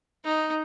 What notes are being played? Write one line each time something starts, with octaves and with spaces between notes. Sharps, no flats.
D#4